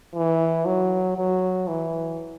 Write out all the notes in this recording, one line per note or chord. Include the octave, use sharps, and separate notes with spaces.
E3
F#3
F#3
E3